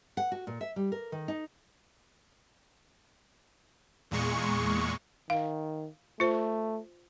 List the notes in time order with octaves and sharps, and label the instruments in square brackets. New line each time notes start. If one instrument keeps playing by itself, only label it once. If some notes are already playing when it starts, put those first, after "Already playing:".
[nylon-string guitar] F#5
F#4
A#2
E5
G3
A#4
D#3
D#4
[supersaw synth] E2 A#2 G#3 C#6
[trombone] D#3 [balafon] F5
[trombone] A3 [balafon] F4 C5